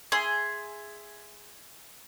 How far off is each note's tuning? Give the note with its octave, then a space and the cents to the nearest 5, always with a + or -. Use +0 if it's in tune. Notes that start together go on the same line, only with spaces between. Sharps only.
G#4 +0 E5 +15 C6 +0